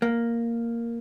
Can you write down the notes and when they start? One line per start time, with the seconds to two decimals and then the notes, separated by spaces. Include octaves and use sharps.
0.02 A#3